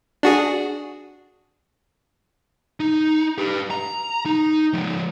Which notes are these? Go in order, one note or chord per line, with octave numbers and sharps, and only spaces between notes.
D4 F#4 G#4
D#4
G4 B4
A#5
D#4
F3 G#3